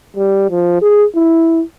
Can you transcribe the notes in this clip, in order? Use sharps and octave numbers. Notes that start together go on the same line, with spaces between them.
G3
F3
G#4
E4